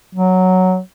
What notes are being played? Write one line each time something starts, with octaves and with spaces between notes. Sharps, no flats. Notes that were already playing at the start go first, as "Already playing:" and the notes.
F#3